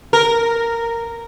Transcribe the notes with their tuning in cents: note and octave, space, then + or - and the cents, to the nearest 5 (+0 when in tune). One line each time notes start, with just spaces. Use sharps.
A#4 -10